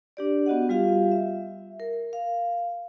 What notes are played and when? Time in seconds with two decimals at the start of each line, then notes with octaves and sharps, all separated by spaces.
0.17 D4 G4 D5
0.46 B3 F#4 D#5 F#5
0.69 G3 F4 G4 F5
1.11 E5
1.80 A#4
2.13 F5